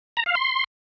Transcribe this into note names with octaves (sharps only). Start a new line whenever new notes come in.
A#5
F5
C6